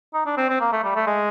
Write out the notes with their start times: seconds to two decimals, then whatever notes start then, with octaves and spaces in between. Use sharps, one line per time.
0.14 D#4
0.26 D4
0.38 C4
0.49 C4
0.60 A#3
0.72 A3
0.84 G3
0.96 A3
1.07 G#3